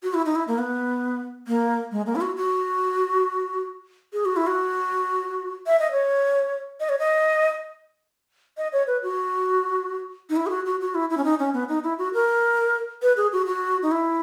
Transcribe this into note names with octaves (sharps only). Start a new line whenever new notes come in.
F#4
E4
D#4
E4
A#3
B3
A#3
G#3
A#3
E4
F#4
F#4
G#4
F#4
E4
F#4
E5
D#5
C#5
D#5
C#5
D#5
D#5
C#5
B4
F#4
D#4
E4
G#4
F#4
F#4
F#4
E4
E4
C#4
D#4
C#4
B3
D#4
E4
F#4
A#4
B4
G#4
F#4
F#4
D#4
E4